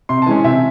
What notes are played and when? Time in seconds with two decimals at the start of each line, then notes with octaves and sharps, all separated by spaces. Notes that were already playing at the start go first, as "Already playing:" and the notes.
0.09 C3 C6
0.22 A5
0.26 E3 G#3 C#4 G#5
0.44 C3 E5